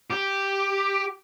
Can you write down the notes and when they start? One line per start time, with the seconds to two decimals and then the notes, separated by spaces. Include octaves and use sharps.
0.10 G4